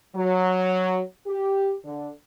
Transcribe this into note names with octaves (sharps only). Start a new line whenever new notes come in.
F#3
G4
D3